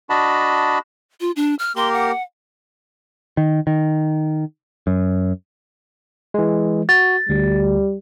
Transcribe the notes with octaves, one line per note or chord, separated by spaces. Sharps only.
D4 F#4 D#5 A5 B5
F4
D4
F6
A#3 G4 A#4 C6
F#5
D#3
D#3
F#2
E3 G#3
F#4 A6
D2 G3